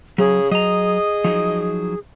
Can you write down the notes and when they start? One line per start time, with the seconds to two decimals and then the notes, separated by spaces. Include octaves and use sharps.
0.18 C#3 F#3 G#4
0.51 F#3 G#4 D#5 A#5
1.24 F3 F#3 D#4